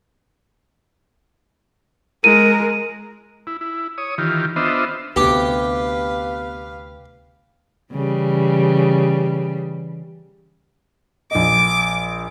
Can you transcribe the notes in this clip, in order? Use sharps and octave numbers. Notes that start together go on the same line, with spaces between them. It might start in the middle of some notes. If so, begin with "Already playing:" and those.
G#3 A#4 D#7
E4
E4
C#5 D#6
D#3 E3 F4 G4
B3 D4 F4 C5 D#5 E5
D2 C3 B3 G4 B4 F5
C#3 E3 G3
A#1 D#5 D6